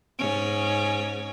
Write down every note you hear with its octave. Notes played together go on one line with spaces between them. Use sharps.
G#2 C#4